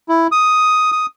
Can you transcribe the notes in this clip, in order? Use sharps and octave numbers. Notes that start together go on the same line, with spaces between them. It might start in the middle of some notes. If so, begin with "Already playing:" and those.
E4
D#6
D#6